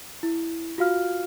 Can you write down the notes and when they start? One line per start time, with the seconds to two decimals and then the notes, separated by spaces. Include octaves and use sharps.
0.23 E4
0.78 F4 F#4 F5 F6